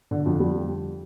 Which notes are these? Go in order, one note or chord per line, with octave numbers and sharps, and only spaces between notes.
D3
F2
G3